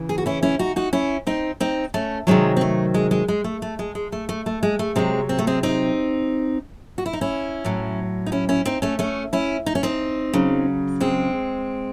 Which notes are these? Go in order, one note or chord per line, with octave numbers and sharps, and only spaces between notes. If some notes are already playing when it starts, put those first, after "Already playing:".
Already playing: C#3 E3
G#4
F#4
C#4 E4
C#4 E4
D#4 F#4
D#4 F#4
C#4 E4
C4 D#4
C4 D#4
A3 C#4
C3 D#3 F#3 G#3 C4
C4
A3
G#3
G#3
G#3
A3
A3
G#3
G#3
A3
A3
A3
G#3
A3
C3 F#3 G#3 C4
C4
A3
G#3 C4
C4 D#4
F#4
E4
D#4
C#4 E4
A2 F#3
D#4
C#4 E4
C#4 E4
C4 D#4
A3 C#4
A3 C#4
C#4 E4
D#4
C#4
C4 D#4
C#3 F#3
G#3 C4